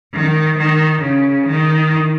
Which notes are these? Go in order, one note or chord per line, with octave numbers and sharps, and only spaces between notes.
D#3
D#3
C#3
D#3